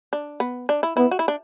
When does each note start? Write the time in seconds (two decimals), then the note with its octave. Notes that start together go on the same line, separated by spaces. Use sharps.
0.13 D4
0.40 B3
0.69 D4
0.83 E4
0.97 B3 E4
1.11 F#4
1.19 E4
1.28 D4